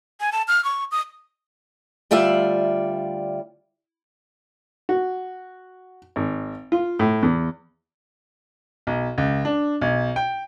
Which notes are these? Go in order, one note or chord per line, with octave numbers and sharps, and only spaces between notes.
G#5
A5
F6
C#6
D#6
D2 G3 F4 D5 E5
F#4
G#1
F4
A2
E2
B1
C#2
D4
B1
G5